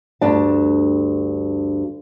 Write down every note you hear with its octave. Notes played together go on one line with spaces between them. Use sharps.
D2 G2 D4 A5